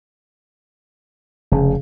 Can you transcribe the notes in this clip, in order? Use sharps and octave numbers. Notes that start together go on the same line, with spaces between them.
F1 C#3